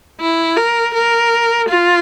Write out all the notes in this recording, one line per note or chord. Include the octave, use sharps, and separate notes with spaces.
E4
A#4
A#4
F4